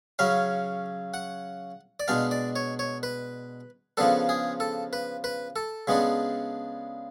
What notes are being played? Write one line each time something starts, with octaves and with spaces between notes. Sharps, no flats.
C#3 F#3 C#4 F5
F#5
D5
B2 G#3 D4 F5
D5
C#5
C#5
B4
C#3 F3 B3 D4 A4
G#4
A4
B4
B4
A4
C#3 G#3 B3 D4